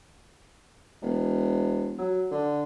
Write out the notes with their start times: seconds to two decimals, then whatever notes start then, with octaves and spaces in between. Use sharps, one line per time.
1.02 E1
1.98 F#3
2.31 D3